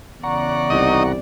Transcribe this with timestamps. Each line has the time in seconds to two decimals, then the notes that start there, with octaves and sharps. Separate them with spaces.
0.23 E2 C#3 D5 F#5 A#5 C#6
0.70 C2 D#4 D#5